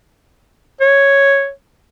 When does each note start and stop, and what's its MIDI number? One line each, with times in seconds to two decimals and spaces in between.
0.81 1.50 73